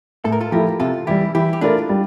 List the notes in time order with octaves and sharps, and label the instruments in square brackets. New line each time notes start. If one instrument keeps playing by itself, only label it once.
[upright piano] A2 [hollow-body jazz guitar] A4
[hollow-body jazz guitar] A#4
F4 A4
[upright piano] F3 A3 E4 [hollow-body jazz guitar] G4 A#4
[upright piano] C3 [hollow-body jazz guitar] F4 A4
[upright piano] E3 G3 [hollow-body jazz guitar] E4 G4
[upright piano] E3 [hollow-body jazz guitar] E4 G4
[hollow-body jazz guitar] G4
[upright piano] A3 E4 A#4 D5 [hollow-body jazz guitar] D4 F4
[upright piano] G3